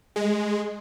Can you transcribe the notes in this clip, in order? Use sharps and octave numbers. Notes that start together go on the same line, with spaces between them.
G#3